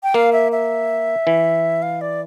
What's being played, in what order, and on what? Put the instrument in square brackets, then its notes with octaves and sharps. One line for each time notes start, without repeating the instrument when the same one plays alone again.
[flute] G5
[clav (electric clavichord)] A#3 [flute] F5
[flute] E5
E5
[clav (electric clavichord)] E3
[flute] F5
D5